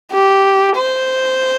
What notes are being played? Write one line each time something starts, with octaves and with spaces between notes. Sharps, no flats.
G4
C5